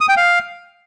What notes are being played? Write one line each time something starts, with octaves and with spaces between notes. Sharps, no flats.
D#6
G5
F5